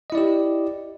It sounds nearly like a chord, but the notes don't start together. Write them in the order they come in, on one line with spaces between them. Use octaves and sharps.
D#5 E4 D5 G4